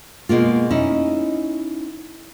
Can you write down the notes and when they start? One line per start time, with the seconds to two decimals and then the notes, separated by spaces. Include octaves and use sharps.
0.29 B2 G#3 A#3 F4
0.71 C#4 D#4 E4